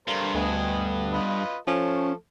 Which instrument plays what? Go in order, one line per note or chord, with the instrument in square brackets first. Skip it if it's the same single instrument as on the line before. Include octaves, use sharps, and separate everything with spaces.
[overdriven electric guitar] G2 [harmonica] D3 A#4 C5
[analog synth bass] D2 [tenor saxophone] B3 [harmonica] D#5 G#5
[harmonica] F4 B4 D#5
[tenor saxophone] F3 [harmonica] A3 A4 [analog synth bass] C#4